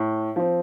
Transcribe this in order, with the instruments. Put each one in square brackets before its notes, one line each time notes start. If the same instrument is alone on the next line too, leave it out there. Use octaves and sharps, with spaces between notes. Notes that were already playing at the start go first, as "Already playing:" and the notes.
Already playing: [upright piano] A2
F3 C4